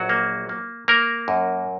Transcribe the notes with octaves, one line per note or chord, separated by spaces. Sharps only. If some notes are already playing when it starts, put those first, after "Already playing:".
Already playing: A#1 F#3 F#4
A#3
A#3
A#3 A#4
F#2